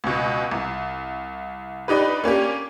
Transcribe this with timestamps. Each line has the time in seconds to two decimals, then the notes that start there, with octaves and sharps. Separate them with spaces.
0.04 C#2 B2
0.51 C2
1.88 D4 D#4 G4 B4
2.24 A#3 C#4 D4 G4